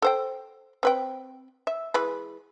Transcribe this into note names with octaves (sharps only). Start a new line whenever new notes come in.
A4 C5 G5
C4 B4 G5
E5
E3 G#3 B4